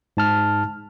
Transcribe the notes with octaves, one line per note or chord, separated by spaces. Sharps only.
G#2 A5 F6